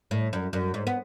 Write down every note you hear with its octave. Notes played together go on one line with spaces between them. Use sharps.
A2
F#2
F#2
G#2
B3